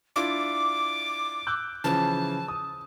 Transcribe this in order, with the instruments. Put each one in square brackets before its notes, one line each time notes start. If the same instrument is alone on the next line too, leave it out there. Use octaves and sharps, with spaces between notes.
[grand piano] D4 E4 F4 [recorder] D6
[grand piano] E6 F#6 G6
[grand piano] C#3 E3 F3 [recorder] A5
[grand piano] D#6